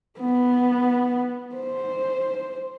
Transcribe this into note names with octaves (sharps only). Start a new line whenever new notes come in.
B3
C5